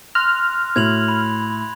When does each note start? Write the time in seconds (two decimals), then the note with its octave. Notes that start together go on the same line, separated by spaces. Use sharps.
0.15 C6 F6 F#6 A#6
0.76 A2 F#4 G#6 F7 F#7
1.08 B5